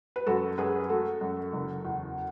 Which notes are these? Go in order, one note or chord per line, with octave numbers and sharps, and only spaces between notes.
B4
F#2 F#4 A4
F#2 G#4 B4
A3 F#4 A4
F#2
F#1
E2